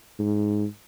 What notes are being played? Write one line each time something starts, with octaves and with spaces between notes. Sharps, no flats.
G#2